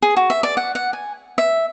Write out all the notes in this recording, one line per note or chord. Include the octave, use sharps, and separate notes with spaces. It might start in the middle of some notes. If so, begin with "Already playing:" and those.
G#4
F#4
E5
D5
F#5
F#5
G#5
E5